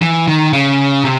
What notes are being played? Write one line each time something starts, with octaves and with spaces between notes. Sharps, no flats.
E3
D#3
C#3
C3